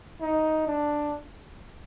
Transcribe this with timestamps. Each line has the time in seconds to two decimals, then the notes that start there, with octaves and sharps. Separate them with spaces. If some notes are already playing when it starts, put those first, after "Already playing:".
0.21 D#4
0.67 D4